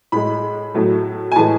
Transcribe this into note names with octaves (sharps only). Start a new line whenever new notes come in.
A2 G#3 B5
A2 F#3 A3
G#5
A2 E3 G#3 A5